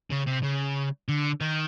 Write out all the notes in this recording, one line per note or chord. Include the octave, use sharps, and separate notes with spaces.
C#3
C3
C#3
D3
D#3